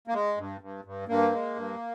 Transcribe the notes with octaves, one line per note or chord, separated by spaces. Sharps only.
A#3
G#3
G2
G2
G2
G2 A#3
G#3
G2